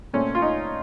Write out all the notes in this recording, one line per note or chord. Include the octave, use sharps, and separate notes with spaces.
A#2 A3 C4 C#4
F4
D#4